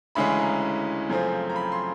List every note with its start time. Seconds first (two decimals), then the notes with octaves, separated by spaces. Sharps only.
0.15 D2 C#3 E3 G#3 C#4 B5
0.39 A#5
1.10 F#2 C#3 F3 A3 C4
1.50 A#5
1.56 B5
1.72 C6